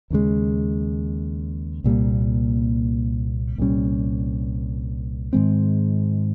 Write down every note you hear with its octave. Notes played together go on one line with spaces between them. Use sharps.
D#2 C#3 G#3
C2 A#2 G3 A#3
C2 A#2 G3 C#4
G#2 D#3 G#3 C4